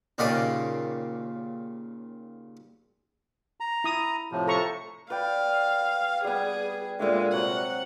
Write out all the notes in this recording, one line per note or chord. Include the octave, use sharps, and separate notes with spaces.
D#2 A#2 C#3 D5 D#5 F5
A#5
E4 D#6
A2 C3 F3
A4 A#5 C#6
B4 D5 F5 G5
G3 B3 G#4
A#2 D3 G#3 E5 F5
C3 F#3 F#5